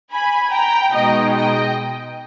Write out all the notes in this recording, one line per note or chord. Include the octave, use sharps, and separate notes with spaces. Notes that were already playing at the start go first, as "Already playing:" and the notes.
G#5 B5
G5 A#5
B2 G#3 B3 D#4 D#5 G5
D#5 G5